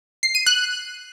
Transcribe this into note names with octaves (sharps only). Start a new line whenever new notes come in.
C7
D#7
F#6